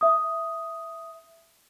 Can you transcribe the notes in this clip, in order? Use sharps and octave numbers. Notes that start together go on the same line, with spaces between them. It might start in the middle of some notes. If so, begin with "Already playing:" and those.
E5 D#6